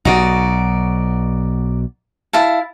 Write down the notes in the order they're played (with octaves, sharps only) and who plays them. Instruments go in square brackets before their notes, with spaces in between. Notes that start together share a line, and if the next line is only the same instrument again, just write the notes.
[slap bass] B1 B2 [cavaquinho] D#4 F#4 D5
[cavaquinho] E4 F5 A5